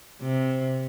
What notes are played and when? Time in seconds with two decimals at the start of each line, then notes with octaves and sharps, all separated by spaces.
0.22 C3